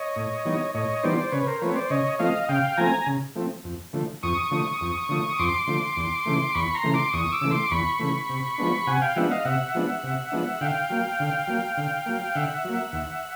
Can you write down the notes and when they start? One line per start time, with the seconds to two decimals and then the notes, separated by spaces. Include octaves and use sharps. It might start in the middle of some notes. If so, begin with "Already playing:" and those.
Already playing: C#5 D#5
0.16 A2
0.45 E3 G3 B3 D#4
0.74 A2 C#5 D#5
1.03 E3 G3 B3 D#4 C5 D5
1.32 C#3 B4 C#5
1.47 A#4 C5
1.61 F3 A3 C4 B4 C#5
1.75 C5 D5
1.90 C#3 C#5 D#5
2.19 F3 A3 C4 D#5 F5
2.49 C#3 F5 G5
2.77 F3 A3 C4 G#5 A#5
3.06 C#3
3.36 F3 A3 C4
3.64 F2
3.93 D3 F3 A3
4.23 F2 C#6 D#6
4.51 D3 F3 A3
4.81 F2
5.09 D3 F3 A3
5.38 F2 C6 D6
5.67 D3 F3 A3
5.96 E2
6.26 C#3 E3 A3
6.55 E2 B5 C#6
6.75 A#5 C6
6.84 C#3 E3 A3
6.94 C6 D6
7.13 E2 C#6 D#6
7.32 D6 E6
7.41 C#3 E3 A3
7.51 C6 D6
7.71 E2 B5 C#6
7.99 C#3 E3 A3
8.29 C3
8.58 F3 G#3 B3 D4
8.87 C3 F#5 G#5
9.02 F5 G5
9.16 F3 G#3 B3 D4 E5 F#5
9.31 D#5 F5
9.45 C3 E5 F#5
9.75 F3 G#3 B3 D4
10.04 C3
10.32 F3 G#3 B3 D4
10.61 D3 F5 G5
10.90 F#3 A#3
11.20 D3
11.48 F#3 A#3
11.77 D3
12.06 F#3 A#3
12.35 D3 E5 F#5
12.65 F#3 A#3
12.93 D#2